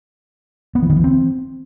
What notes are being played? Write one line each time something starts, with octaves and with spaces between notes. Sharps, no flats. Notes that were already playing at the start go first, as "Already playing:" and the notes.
B3
E3
D#3
E3
C4